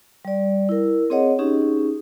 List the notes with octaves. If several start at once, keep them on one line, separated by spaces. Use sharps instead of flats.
G3 D5
E4 A#4
C4 G#4 C#5 D#5 F#5
C#4 D#4 G4 G#4